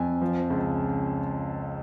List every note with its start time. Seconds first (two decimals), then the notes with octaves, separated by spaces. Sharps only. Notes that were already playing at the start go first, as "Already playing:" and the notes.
Already playing: F2 G#5
0.21 F3
0.50 C#2